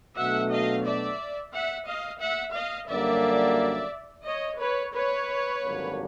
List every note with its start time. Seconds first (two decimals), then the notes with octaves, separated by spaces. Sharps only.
0.17 B2 F#3 A3 D4 E5 F#5
0.51 D#5 F5
0.85 D5 E5
1.53 E5 F#5
1.87 D#5 F5
2.21 E5 F#5
2.55 D#5 F5
2.89 F#2 D3 G3 A#3 D5 E5
4.25 C#5 D#5
4.59 B4 C#5
4.93 B4 C#5
5.61 G#1 F#2 D3 G3 A#3